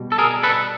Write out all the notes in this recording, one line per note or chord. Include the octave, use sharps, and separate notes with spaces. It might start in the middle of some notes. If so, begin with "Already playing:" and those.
Already playing: B2 G3
A4
G#4 A#4
A4 B4